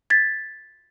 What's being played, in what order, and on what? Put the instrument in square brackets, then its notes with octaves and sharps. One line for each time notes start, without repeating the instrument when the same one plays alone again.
[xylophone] G#6 A6 B6